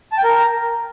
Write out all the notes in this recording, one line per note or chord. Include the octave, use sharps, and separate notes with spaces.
A5
G5
A#4